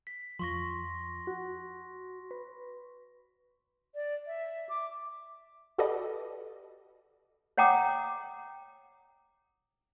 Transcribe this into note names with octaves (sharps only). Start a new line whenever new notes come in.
B6
F2 F3 C6 C#6 A#6
F#4
B4
D5
E5
D6
F#4 G4 A4 B4 D5 D#5
C#5 F#5 G5 A#5 D6 D#6